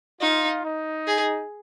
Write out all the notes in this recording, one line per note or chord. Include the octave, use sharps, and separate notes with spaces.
D#4 F4
D#4
G#4